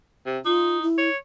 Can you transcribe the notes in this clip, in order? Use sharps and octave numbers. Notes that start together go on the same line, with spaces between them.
C3
D#4 F4
E4
C#5